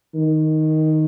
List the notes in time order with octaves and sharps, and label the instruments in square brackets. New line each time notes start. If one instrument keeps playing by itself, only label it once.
[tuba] D#3